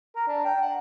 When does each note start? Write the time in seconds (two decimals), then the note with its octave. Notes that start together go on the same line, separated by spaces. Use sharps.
0.16 A#4
0.28 D4
0.44 G5
0.61 F#5